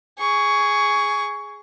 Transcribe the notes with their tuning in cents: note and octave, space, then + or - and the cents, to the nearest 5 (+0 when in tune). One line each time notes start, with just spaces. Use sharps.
G#4 +0 C#6 +15